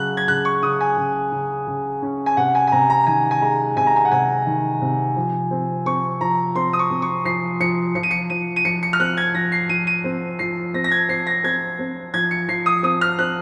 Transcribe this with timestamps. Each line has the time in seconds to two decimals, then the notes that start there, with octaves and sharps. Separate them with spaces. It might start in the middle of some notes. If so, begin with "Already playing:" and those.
Already playing: C#3 F#3 F#6
0.17 G#6
0.28 C#3 F#6
0.45 C#6
0.63 C#3 D#6
0.81 G#5
0.97 C#3
1.32 C#3
1.67 C#3
2.02 C#4
2.26 G#5
2.37 C3 F#5
2.55 G#5
2.67 G#5
2.72 C3 A#5
2.90 A#5
3.07 D#3 G#5
3.31 G#5
3.41 G#3 A#5
3.76 C3 G#5
3.87 A#5
3.96 G#5
4.05 F#5
4.12 C3 G#5
4.46 D#3
4.81 C3
5.16 F3
5.51 C4
5.86 C4 C#6
6.21 F3 A#5
6.55 C4 C6
6.73 D#6
6.79 C#6
6.91 C4
7.02 C#6
7.25 F3 C7
7.60 F3 C#7
7.95 F3 C#7
8.03 D#7
8.11 C#7
8.30 F3 D#7
8.56 D#7
8.65 F3 C#7
8.83 C#7
8.93 F6
9.00 C4 F#6
9.17 G#6
9.34 F3 A#6
9.52 C7
9.69 F3 D#7
9.87 D#7
10.04 C4
10.39 F3 C7
10.74 C4 A#6
10.84 A#6
10.91 G#6
11.09 C4 C7
11.27 A#6
11.44 C4 G#6
11.79 C4
12.14 F3 G#6
12.31 C#7
12.49 F3 C7
12.66 D#6
12.83 C4 D#6
13.01 F6
13.19 C4 F#6